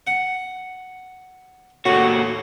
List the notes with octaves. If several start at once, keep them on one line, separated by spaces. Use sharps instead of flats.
F#5
D#2 A2 F#4